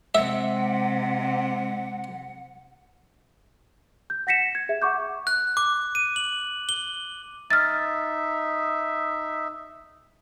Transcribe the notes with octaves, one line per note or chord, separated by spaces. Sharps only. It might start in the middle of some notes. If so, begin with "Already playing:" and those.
C3 G#3 E5 F#5
G6
F#5 A#6 B6 C#7 E7
G#6
G#4 E5
F#5 C#6 D6 G6
F#6
D6
D#7
F#7
G7
D#4 E5 F6 A6